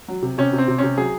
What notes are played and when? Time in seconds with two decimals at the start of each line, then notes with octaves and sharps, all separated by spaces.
0.08 F#3
0.23 C3
0.38 C3 C#4
0.53 C3
0.58 C4
0.68 C3
0.78 C#4
0.84 C3
0.98 F#3 G#4